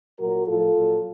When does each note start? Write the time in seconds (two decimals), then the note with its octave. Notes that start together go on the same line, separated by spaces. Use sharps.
0.19 A#2 F#3 F#4 A#4
0.47 A2 F3 F4 A4
0.76 A#2 F#3